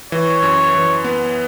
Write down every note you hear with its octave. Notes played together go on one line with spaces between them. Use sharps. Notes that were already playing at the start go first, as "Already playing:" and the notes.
E3 C#5
F#2
E3
B3